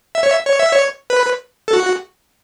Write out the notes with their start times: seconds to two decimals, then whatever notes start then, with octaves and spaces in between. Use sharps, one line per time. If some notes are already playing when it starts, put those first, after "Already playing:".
0.15 E5
0.23 C#5
0.31 E5
0.46 C#5
0.60 E5
0.72 C#5
1.10 B4
1.68 A4
1.73 F#4